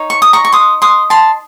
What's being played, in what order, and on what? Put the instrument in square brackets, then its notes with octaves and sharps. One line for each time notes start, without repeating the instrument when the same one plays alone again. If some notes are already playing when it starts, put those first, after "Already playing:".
Already playing: [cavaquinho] D#4 C#5
C#6
D#6
A#5 C#6
C#6
C6 D#6
C6 D#6
A5 C6